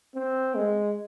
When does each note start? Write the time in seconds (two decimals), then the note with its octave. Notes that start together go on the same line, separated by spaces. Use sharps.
0.15 C4
0.55 G#3